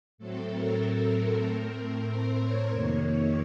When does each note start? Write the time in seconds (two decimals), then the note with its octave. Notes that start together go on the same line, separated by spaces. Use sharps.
0.18 A2 F#3 A3 C4 A4
0.49 A#4
1.44 A2 A3 C4
2.07 C5
2.40 C#5
2.70 F2 C3 D#3 A#3